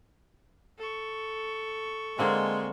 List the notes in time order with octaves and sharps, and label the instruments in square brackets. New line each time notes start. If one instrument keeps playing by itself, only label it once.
[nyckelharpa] A4 C#6
[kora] D3 A#3 C4 [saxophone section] G#3